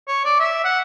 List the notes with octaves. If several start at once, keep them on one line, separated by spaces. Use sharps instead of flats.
C#5
D5
E5
F#5